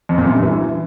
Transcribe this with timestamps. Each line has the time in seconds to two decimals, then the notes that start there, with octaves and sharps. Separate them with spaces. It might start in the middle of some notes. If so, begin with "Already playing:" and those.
0.09 F2
0.18 A#2
0.26 F#2
0.34 G2
0.43 E3